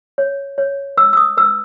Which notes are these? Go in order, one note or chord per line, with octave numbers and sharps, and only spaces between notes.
C#5
C#5
B4 E6
E6
D#6
B4 E6